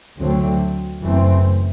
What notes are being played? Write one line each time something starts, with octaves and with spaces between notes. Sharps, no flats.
D2 D3 F#3 A3 C4
F#1 F#2 E3 A3 C4